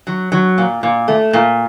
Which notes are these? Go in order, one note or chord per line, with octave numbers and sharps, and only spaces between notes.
F#3
F#3
A#2
A#2
A3
A#2